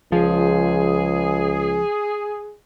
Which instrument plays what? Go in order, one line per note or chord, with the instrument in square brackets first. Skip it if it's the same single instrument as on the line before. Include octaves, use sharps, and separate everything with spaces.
[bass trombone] C#2 [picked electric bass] F3 [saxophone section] G#4